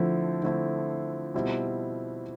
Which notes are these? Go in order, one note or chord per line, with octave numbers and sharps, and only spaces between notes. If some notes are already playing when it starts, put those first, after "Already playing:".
Already playing: D3 F3 A3 C4 E4
D3 A3 C4 E4
B2 G3 C4 E4